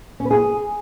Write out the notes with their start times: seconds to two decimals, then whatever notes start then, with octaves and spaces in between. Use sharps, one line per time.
0.20 C#4
0.25 B4
0.30 G#4